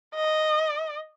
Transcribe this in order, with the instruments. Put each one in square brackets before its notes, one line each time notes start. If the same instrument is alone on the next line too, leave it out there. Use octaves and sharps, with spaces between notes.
[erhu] D#5